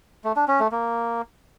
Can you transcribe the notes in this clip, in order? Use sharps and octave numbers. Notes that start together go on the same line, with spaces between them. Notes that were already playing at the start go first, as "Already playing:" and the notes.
A3
D4
C#4
A3
A#3